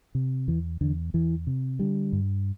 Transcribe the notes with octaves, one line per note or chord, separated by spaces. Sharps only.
C3
E2 E3
E2 D3
E2 E3
C3
D3 G3
G2